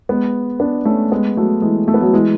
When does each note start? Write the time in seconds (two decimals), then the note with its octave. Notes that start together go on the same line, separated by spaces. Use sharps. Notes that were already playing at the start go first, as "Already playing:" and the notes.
0.09 G#3 B3
0.60 B3 D4
0.85 A3 C#4
1.12 G#3 B3
1.37 F#3 A3
1.62 E3 G#3
1.88 A3
1.94 B3
2.01 F#3 A3
2.13 E3 G#3